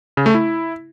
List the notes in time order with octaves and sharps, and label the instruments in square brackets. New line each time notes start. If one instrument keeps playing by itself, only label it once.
[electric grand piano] C#3
A3
E4